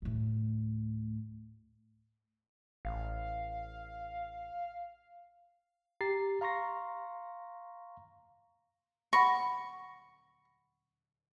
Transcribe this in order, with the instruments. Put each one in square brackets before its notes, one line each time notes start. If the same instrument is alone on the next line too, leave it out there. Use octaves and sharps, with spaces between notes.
[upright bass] D2 A2
[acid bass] A1 [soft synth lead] F5
[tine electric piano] G4 A#5 A6 C7
F5 A#5 C6 C#6 A#6
[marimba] F#5 B5 A#6 [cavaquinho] C#6